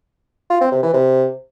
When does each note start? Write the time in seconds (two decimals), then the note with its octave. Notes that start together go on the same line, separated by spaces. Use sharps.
0.50 F4
0.61 C4
0.72 C3
0.83 E3
0.94 C3